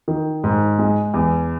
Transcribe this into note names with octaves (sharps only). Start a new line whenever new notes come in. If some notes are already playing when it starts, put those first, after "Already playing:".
D#3
G#2
G#3
E2